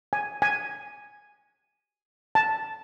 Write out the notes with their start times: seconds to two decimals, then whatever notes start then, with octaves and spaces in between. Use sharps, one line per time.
0.13 G#5
0.42 G#5
2.35 A5